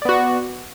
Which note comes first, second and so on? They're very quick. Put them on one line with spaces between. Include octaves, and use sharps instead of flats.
D5 B3 F#4